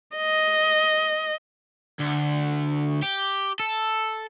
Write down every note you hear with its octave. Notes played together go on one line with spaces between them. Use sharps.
D#5
D2
G4
A4